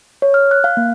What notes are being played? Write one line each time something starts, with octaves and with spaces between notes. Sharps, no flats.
C#5
F6
F#6
F5
A#3